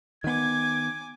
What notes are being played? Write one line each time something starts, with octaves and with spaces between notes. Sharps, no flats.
D#3 B3 G#5 D6 G#6